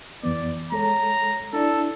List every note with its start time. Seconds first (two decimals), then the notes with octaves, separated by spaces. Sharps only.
0.23 F2 E3 B3 D5
0.72 G#3 A4 C#5 A#5
1.53 D4 E4 A4 D5